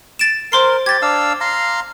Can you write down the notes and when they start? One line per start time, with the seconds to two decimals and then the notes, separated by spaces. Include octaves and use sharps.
0.19 A6 D7 E7
0.52 A#4 C5 C6 C7
0.86 G4 G#6 A6
1.02 D4 F5 E6
1.41 F5 A#5 C6